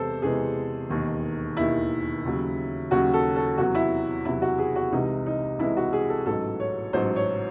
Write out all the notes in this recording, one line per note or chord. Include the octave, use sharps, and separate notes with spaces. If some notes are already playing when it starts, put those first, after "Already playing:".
Already playing: E2 C3 E3 G#3 A4 C5
E2 C3 E3 G#3 G#4
E1 D#2 D#3
E1 D#2 D#3 E4
D#2 C#3 F#3
D#2 C#3 F#3 F#4
A4
A4
E2 C3 F#3 F#4
E4
E2 C3 F#3 E4
F#4
G#4
F#4
C2 C3 E3 G#3 D#4
D#4
C2 C3 E3 G#3 E4
F#4
G#4
A4
A1 G#2 F#3 A4
C#5
A1 G#2 F#3 C5
C#5